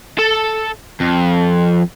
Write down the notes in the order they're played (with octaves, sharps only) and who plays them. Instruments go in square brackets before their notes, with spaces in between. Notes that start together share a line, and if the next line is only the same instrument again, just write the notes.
[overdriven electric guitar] A4 A5
F2